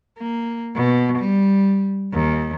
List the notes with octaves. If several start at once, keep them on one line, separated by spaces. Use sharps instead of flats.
A#3
B2
G3
D#2